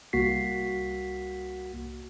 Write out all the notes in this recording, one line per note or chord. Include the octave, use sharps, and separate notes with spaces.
C2 A#3 F#4 B6 C7